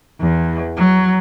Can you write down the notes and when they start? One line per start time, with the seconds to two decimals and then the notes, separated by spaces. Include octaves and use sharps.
0.20 E2
0.77 F#3